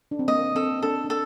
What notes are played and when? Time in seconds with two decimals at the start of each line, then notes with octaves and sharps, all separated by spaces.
0.11 D4
0.19 C4
0.28 A#3 D#5
0.55 C4 A4
0.82 D4 A4
1.04 D4
1.10 A4